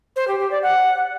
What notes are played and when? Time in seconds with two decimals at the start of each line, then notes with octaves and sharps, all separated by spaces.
0.16 C5
0.28 G4
0.39 G4
0.51 D5
0.63 F#5